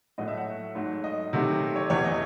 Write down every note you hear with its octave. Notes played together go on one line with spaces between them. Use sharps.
A2 F#3 A3 D#5
E5
F#5
G#2 F#3 A3
D#5
C3 D#3 F#3 A3
C#5
E2 C3 E3 A3 C#5
D#5